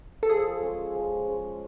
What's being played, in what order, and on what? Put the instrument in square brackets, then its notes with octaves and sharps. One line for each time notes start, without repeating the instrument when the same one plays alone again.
[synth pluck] A4
[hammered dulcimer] F3 [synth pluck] G#4
[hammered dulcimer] G#3 C#4
F3
G#3 C#4